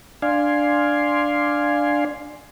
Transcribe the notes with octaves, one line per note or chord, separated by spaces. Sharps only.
D4 D5 F5 G#5 C6